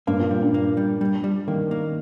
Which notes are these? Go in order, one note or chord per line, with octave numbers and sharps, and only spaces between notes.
G2 A#3
A#2
G3
G2
A#3
G3
G3
G3
D#3 A#3
A#3